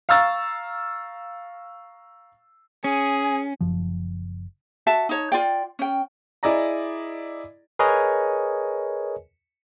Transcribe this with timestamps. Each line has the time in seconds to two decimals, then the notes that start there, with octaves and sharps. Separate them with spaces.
0.09 F5 A#5 C#6 E6 A6
2.84 C#4 G#4
3.61 F#1 F3
4.87 F#4 E5 A5
5.09 D#4 C#5
5.32 F4 D5 G5
5.79 C#4 G5
6.43 E4 G#4 D5 D#5 A#5
7.79 G#4 A#4 B4 C#5 D#5 G#5